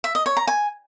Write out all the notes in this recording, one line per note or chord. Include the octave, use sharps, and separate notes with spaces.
E5
D#5
C#5
A#5
G#5